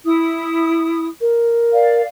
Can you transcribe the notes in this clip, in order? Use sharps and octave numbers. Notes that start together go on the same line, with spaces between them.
E4 D#6
A#4
D5 F5